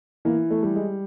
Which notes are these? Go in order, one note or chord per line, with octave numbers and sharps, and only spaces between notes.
E3 A#3
A3
G3
G#3